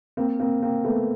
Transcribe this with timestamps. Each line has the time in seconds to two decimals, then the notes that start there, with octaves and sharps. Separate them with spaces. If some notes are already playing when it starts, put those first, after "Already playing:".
0.17 A#3 C4
0.39 A#3 C4
0.62 A#3 C4
0.85 A3 B3